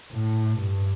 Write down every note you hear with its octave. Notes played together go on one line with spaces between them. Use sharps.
A2
G2